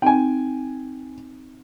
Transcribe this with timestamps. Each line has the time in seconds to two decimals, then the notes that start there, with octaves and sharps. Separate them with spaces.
0.02 C4 D#4 G5 G#5